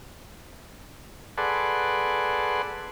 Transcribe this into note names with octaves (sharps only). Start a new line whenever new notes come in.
G#4 A4 B4 D5 F#5 C6